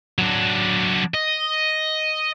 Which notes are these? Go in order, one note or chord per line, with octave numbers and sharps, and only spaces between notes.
F#3 D4
D#5